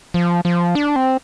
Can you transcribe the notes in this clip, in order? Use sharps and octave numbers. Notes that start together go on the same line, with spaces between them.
F3
F3
D4
C4